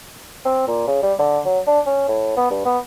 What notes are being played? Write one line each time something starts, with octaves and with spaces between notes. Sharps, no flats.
C4
A#2
C#3
G3
D3
F#3
D4
C#4
A2
B3
G2
B3